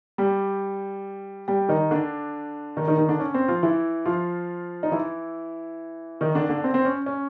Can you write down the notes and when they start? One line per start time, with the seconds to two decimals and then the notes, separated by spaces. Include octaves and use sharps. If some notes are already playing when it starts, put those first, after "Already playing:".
0.18 G3 G4
1.48 G3 G4
1.69 D#3 D#4
1.91 D3 D4
2.77 D#3 D#4
2.88 D#3 D#4
2.98 D#3 D#4
3.09 D3 D4
3.20 C#4
3.34 C4
3.48 F3 F4
3.63 E3 E4
4.06 F3 F4
4.83 D#4
4.92 E3 E4
6.21 D#3 D#4
6.35 D3 D4
6.49 D3 D4
6.64 C4
6.74 C4
6.85 C#4
7.06 C#4